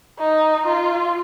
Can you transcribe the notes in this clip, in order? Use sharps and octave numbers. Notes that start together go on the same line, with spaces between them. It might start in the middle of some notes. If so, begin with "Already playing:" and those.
D#4
F4